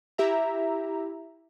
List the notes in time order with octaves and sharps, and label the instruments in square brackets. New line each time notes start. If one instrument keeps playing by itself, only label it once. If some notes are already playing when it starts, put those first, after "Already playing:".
[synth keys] E4 G4 E5 A#5